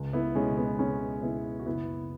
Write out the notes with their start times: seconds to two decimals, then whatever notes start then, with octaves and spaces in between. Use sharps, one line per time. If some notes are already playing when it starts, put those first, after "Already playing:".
Already playing: C#2
0.13 B3 E4
0.34 B2 G#3 C#4
0.57 B3
0.78 C#2 G#3 C#4
1.22 B2 B3 E4
1.60 F#4
1.66 F#1 B3 E4